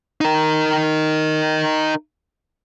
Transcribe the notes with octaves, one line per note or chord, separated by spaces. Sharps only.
D#4 A#4